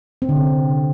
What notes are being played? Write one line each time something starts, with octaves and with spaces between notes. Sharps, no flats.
C4
D3
C3